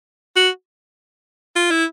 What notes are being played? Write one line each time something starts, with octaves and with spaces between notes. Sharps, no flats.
F#4
F4
E4